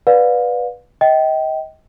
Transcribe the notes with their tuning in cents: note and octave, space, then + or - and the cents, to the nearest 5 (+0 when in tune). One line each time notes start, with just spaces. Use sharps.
B4 -10 D5 +0 F5 +35
D#5 +30 G5 -15